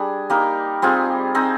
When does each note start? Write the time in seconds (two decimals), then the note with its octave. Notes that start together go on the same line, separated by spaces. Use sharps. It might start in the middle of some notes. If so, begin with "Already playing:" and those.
Already playing: G3 D4 G#4
0.30 G3 A#3 D#4 A#4
0.82 G3 C4 F4 G#4
1.35 C4 D#4 G#4